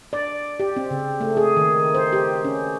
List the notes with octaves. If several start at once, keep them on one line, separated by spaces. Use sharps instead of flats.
D5
G4
C4
C#3
A3
G#4
D#3
C5
G4
C#4